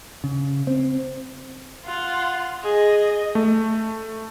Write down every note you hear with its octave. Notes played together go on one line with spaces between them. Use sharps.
C#3
C4
F4 F#5
G#4 D#5
A3